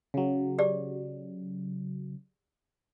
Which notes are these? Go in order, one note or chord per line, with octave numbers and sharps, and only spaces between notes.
C#3 F#3
G4 G#4 D5